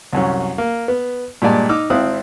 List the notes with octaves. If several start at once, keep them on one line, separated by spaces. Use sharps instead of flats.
C2 F#2 C#4
A#3
B3
G2 A#2 G#3 D5 A5
D#4 D6 E6 F6
G#1 C4 E4 F5 D#6 F#6